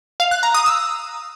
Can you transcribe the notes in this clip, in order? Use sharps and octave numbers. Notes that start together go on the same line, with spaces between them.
F5
F#6
A#5
D#6
E6